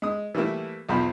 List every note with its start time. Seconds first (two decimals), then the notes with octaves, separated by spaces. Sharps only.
0.02 G#3 D#6
0.35 E3 G3 A3 A#3 E4
0.89 B1 E2 F3 C5 A#5 B5